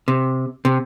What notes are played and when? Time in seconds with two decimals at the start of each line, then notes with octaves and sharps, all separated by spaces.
0.08 C3
0.65 C3